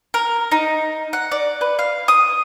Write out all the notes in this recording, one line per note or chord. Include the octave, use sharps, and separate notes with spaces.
A#4
D#4
F#5
D5
B4
F5
D#6